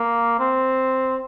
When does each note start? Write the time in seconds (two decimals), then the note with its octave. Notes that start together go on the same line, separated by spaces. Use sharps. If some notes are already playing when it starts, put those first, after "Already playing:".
Already playing: A#3
0.39 C4